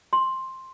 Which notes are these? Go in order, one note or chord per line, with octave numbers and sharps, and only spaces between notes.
C6